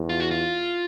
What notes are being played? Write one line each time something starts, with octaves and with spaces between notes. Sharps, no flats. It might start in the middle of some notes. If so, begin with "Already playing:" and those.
Already playing: E2
F4
F#4
F4